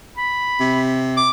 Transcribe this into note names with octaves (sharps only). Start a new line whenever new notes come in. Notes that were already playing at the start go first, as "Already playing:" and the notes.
B5
C3
D6